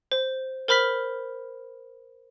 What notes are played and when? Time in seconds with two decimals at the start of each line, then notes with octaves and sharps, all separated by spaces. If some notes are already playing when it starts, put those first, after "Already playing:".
0.12 C5
0.68 A#4 C5 B5 F6 B6